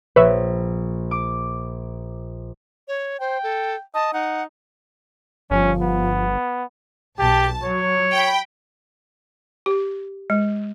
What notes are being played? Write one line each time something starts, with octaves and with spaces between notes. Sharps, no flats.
A#1 B4 C#5 E5
D6
C#5
C5 G5
A4
D#5 A5
D#4 F#5
G1 F3 C#4
B3
B1 G4 A5
F#3 C#5
G5 B5
G4
G#3